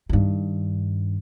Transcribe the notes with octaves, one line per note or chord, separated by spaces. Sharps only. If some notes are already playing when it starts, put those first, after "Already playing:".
G2 D#3